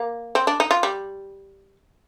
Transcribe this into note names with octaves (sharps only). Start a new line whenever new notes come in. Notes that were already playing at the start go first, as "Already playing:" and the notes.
Already playing: A#3
C4
D4
D#4
F4
G3